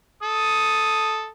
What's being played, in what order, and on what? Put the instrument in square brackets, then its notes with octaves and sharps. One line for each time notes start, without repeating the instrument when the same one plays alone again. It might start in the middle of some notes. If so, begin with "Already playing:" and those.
[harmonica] A4 [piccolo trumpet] D#6